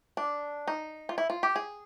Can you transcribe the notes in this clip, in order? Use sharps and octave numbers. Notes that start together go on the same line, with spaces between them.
D4
D#4
F4
E4
F4
G4
G#4